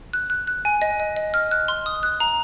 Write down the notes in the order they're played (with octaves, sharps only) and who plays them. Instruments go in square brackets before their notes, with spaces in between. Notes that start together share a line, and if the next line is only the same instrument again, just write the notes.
[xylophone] F#6
F#6
F#6
G#5
D#5
D#5
D#5
F6
F#6
C6
D#6
F#6
A#5